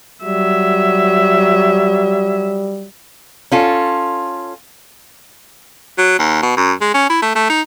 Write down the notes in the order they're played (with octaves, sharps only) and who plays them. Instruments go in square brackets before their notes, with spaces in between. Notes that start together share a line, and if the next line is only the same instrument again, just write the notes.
[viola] F#3 E5 [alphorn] G3
[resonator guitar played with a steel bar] C#4 F4 A4
[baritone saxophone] F#3
D#2
B2
F#2
G#3
C#4
E4
A3
A3
D#4